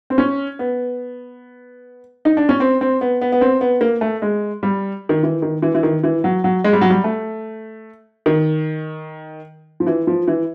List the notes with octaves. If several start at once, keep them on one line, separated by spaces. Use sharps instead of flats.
C4
C#4
B3
D#4
D4
C#4
C4
C4
B3
B3
B3
C4
B3
A#3
A3
G#3
G3
D#3
E3
D#3
E3
E3
D#3
E3
F#3
F#3
G#3
G3
F#3
G3
A3
D#3
F3
E3
F3
E3